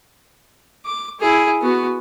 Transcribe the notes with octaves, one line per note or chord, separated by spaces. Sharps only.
D6
E4 G#4
B3 F#4